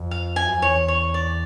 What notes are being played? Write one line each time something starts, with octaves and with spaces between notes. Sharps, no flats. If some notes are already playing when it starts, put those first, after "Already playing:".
Already playing: F2
F5
G#5
F#2
F2
E2 C#5
C#5
D5